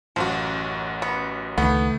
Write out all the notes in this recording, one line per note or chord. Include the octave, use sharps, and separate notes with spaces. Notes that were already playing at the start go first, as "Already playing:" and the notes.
A1 F#2 F3 F#4
B3
C#2 D#3 A3 B3